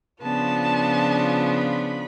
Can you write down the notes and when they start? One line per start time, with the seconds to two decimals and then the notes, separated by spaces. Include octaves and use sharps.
0.22 C#3 F3 B3 D4 F4 A5
1.58 B5